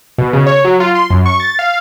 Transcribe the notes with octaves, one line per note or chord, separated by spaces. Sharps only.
B2
C#3
C#5
F#3
F4
C6
F#2
C#6
A6
F5